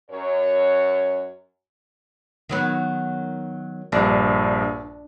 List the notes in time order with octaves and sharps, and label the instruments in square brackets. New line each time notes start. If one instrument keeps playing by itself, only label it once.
[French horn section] F#2 C#5
[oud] D#3 F#3 B3
[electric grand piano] A#1 G2 [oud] D4